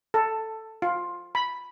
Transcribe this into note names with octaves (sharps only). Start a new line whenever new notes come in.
A4
F4
B5